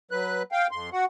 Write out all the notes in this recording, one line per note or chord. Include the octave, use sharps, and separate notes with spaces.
F#3 B4 F#6
F5 G5
F2 C6
F#4 F#5